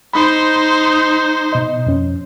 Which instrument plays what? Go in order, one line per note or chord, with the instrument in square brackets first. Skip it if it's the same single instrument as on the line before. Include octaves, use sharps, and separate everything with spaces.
[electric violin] D#4 C5 [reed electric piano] B5
[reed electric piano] B2 D#5
F2 C#4